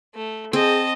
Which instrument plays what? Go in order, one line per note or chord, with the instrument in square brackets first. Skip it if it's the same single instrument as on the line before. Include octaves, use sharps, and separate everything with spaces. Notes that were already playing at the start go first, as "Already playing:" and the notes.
[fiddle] A3
[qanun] C4 [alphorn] G#4 [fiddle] D#5 A5